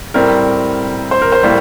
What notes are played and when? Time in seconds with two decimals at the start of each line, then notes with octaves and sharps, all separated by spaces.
0.14 A2 G3 C4 A#4
1.11 C5
1.22 A#4
1.32 C5
1.43 A2 G3 A#3